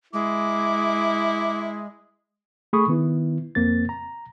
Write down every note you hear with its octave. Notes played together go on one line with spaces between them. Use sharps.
G#3 E4 D6
A3 G#4 B5 C#6 D#6
D#3 B3 E4
F2 A#3 C4 A6
A#5